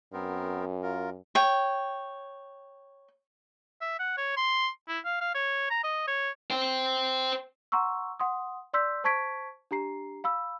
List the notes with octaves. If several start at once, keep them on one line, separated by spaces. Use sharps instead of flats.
F#2 B3 C4 A#4
F4 A#4
C#5 G5
E5
F#5
C#5
C6
E4
F5
F5
C#5
A#5
D#5
C#5
C5 G5
F#5 A#5 C6 C#6 E6
F#5 C6 D#6
D5 C6 E6 G6 B6
C5 A5 C#6 G#6 B6 D7
D4 G4 A#5 C7
F5 B5 E6